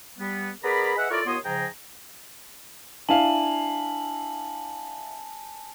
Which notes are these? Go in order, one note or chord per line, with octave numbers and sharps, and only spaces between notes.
G3 B3
B3 G#4 A#4 D5 A#5 B5
G#4 B4 D#5 E5 F#5
E4 F4 A4 A#4 C#5 D5
D#2 B3 F4 C#5 C6 D#6
G#2 C#3 F3 G#4 G5 A#5
D4 E4 F5 G#5 A5 F#7